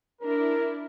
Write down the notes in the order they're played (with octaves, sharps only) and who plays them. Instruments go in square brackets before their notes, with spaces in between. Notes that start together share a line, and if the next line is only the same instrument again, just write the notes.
[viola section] D4 E4 [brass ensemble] A#4